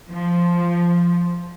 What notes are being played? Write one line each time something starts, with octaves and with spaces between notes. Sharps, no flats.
F3